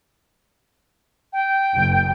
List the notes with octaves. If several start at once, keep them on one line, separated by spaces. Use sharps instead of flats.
G5
F#1